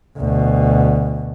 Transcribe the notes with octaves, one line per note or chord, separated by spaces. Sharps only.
D2 B2